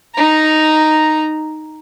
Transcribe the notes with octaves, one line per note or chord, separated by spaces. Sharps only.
D#4 A#5